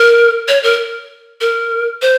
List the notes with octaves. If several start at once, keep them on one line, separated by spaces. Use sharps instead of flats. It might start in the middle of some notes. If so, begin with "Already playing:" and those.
Already playing: A#4
C#5
A#4
A#4
C5